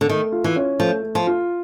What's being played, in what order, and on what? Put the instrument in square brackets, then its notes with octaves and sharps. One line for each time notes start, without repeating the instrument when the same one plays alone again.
[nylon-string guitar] D3
[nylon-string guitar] D#3 [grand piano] A3
[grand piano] F4
[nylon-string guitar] E3
[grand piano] C#4
[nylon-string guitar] F3 [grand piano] A3
[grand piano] A3
[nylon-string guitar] F3
[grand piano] F4